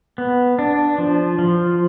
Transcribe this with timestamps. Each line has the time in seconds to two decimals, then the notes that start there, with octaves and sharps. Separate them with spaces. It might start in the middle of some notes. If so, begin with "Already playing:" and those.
0.18 B3
0.59 D4
0.98 F3
1.39 F3